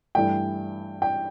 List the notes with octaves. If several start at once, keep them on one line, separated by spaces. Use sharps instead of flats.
G2 E3 A3 G5
G5